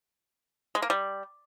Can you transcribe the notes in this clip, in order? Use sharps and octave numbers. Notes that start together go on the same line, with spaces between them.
G#3
A#3
G3